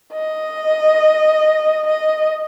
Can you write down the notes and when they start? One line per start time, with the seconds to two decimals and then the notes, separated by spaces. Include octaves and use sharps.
0.12 D#5
1.87 D#5